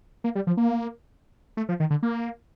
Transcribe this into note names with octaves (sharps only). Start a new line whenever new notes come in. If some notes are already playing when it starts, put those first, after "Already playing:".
A#3
G3
F3
A#3
A3
F3
D#3
D3
A#3